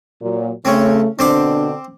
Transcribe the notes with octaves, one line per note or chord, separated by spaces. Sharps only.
A#2 F#3
C#3 A3 C4 C#4
B2 D3 C4 D4 C5 D6